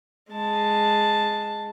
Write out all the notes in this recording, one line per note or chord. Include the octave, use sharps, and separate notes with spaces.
G#3 A5